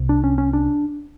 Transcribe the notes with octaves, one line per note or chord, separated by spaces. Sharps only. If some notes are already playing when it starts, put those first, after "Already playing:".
Already playing: C2 C3
D4
C#4
C#4
D4